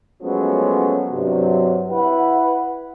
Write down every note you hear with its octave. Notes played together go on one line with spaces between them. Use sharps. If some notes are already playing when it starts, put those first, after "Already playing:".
F3 F#3 G#3 A3 B3 C#4
G2 C3 F#3
E4 B4 F#5